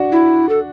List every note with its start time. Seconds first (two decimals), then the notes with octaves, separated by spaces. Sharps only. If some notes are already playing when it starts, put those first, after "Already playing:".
Already playing: D4 F#4
0.12 E4
0.49 A4